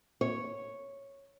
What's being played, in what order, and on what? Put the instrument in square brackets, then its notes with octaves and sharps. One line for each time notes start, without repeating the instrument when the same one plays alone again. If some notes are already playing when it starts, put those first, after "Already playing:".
[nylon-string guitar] C#5